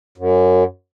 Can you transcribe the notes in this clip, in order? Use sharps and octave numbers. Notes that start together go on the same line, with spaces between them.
F#2